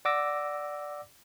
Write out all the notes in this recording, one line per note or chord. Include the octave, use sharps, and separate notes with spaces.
D5 F#5 D6 E6 A#6